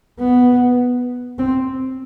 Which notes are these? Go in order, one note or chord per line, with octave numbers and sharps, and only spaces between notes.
B3
C4